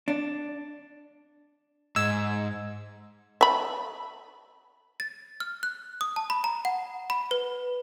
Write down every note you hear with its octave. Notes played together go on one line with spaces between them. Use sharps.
D4
G#2 D#5 E6 G#6
E5 B5
A6
F6
F#6
D#6
A5
B5
A#5
F#5
B5
B4